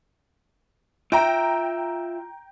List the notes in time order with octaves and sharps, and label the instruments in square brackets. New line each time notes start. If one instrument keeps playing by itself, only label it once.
[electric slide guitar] F4 E5 [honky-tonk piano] G5 A#5